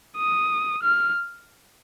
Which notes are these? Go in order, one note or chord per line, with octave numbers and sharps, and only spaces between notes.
D#6
F6